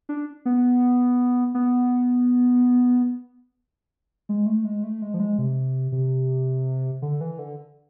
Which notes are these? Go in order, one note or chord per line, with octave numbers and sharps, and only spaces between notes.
D4
B3
B3
G#3
A3
G#3
A3
G#3
F3
G#3
C3
C3
D3
E3
D3